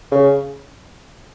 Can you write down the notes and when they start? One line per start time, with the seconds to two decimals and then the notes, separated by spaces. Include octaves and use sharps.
0.12 C#3